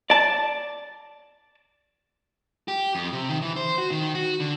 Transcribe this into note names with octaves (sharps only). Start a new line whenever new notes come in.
D5 A5
G4
F2
C3
D#3
E3
C5
F#4
D#3
F#4
D3